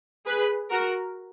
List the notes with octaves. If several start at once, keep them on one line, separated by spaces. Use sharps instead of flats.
G#4 B4
F#4 A#4